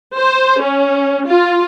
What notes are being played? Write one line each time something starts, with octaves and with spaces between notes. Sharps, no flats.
C5
C#4
F4